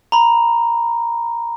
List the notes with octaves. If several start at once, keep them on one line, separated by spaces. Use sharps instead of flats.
A#5 B5